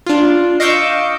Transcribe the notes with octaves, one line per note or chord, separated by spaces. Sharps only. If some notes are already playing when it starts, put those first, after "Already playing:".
D4 F4
D#5 F5 C#6 D6 E6 G6